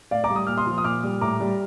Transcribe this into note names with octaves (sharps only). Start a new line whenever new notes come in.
A2 D5 F5
A#5 D6
G3
D#6
A#2 F6
C6 D#6
F3
D#6
A#2 D6 F6
G3
A2 A#5 D6
G3